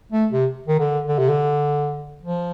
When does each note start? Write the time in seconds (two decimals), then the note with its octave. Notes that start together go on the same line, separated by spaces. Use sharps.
0.12 A3
0.32 C3
0.68 D#3
0.79 D3
1.08 D3
1.18 C3
1.29 D3
2.23 F3